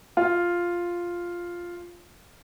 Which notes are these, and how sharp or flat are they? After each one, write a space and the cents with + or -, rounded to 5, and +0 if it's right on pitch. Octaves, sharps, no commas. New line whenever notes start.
F4 +0